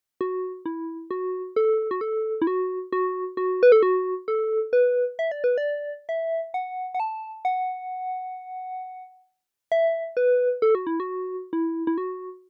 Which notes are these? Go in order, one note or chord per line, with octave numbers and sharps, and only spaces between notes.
F#4
E4
F#4
A4
F#4
A4
E4
F#4
F#4
F#4
B4
A4
F#4
A4
B4
E5
D5
B4
D5
E5
F#5
F#5
A5
F#5
E5
B4
A4
F#4
E4
F#4
E4
E4
F#4